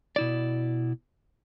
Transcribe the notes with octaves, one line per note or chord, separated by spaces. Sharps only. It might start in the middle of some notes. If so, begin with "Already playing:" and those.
B2 E4 D5